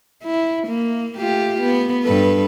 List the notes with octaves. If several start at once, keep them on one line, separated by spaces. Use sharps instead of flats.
E4
A#3
A3 F4 G4
B3
G2 A4 B4